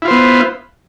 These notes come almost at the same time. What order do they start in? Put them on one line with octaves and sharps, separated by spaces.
E4 F4 C5 B3